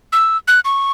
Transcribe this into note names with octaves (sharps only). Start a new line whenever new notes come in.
E6
F#6
C#6